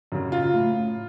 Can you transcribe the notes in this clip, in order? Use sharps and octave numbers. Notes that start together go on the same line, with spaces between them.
F#2 C#3
F4
A2